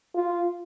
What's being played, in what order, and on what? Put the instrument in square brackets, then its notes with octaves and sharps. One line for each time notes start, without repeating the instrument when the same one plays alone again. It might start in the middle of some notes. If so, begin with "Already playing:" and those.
[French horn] F4